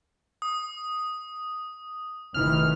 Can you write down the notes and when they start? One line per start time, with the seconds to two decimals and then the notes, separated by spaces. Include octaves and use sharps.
0.42 D#6
2.34 F1 D#3 E3 F6